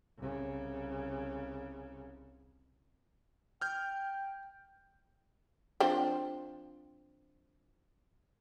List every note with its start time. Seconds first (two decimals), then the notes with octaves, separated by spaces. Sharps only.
0.17 C2 C#3
3.61 G5 F6 G6
5.80 F3 C4 D4